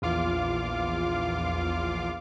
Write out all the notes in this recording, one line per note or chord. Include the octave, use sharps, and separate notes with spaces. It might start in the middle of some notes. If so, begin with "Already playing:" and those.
A#1 E2 F4 F5 D6